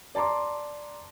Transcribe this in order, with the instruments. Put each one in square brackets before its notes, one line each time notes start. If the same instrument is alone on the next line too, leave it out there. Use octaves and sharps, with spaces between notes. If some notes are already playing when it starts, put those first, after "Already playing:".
[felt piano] D5 A5 A#5 C6 D6